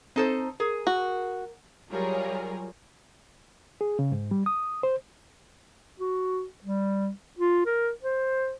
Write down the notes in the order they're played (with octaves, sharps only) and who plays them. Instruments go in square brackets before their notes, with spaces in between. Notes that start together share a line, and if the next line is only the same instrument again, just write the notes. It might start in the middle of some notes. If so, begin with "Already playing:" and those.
[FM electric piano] C4 A5 [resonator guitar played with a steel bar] D#4 A4 C5
[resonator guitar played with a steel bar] G#4 [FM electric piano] A#4
[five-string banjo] F#4
[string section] F#3 G3 F4 G#4 A#4 C#5
[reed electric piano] G#4
C#3
G#2
G3
D#6
C5
[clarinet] F#4
G3
F4
A#4
C5